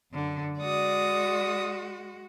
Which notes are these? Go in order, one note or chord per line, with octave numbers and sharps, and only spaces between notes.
F#2 D3
G#3 F#4 D5 D#6